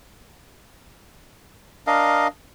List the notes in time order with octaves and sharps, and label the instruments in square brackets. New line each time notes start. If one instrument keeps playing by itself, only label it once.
[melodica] D4 A#4 D#5 F5